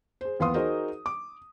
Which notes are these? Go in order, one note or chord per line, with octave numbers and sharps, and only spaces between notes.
G#4 C5
D#2 E3 B3 F5 C6 D#6
D#4 F#4 G#4 A#4 C5
D6